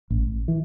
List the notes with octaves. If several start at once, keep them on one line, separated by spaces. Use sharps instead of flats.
A1
E3